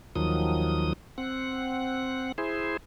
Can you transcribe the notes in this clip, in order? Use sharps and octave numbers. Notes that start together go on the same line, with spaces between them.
D#2 D#3 F3 F#3 D#6
C4 F#5
E4 G#4 C5